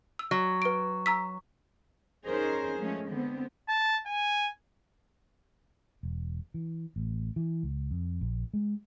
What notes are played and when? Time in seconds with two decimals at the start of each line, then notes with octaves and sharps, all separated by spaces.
0.19 E6
0.31 F#3
0.62 B4 D7
1.06 A#5 E6 B6
2.26 C#4 D#4 G#4 A#4 C5
2.79 F3 G#3 A3 C#4
3.09 D3 B3 C4
3.68 A5
4.06 G#5
6.03 E1
6.54 E3
6.96 A1
7.36 E3
7.63 C#2
7.91 F2
8.21 A#1
8.54 G#3